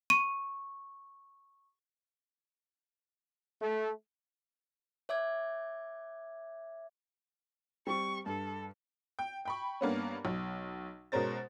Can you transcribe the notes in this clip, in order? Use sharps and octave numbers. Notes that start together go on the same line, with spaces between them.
C#6 D#7
A3
C#5 E5 D6 G#6
G3 C4 C#6
G2 A4
G5
G5 B5 C#6
G2 A#3 B3 C#4
B1
B2 G#3 C#4 A#4 C5 A6